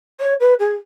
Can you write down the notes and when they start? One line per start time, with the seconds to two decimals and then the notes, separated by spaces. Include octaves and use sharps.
0.20 C#5
0.40 B4
0.60 G#4